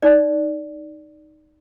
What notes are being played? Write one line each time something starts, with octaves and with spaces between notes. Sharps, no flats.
D#4 D5